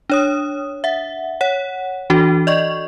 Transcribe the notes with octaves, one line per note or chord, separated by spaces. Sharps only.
D4 C#5 D#6
E5 F#5
C#5 F#5
E3 D4 F#4 A4
D5 D#5 C#6